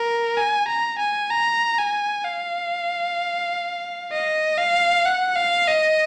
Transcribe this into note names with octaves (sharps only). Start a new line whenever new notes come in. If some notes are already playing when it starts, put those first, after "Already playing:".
Already playing: A#4
G#5
A#5
G#5
A#5
G#5
F5
D#5
F5
F#5
F5
D#5